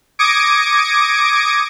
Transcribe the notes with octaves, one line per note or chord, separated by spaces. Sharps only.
D6 D#6 G#6 A#6 C#7 D7